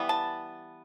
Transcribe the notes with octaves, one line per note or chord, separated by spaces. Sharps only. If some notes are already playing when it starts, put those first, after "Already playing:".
Already playing: E3 G3 B3
A5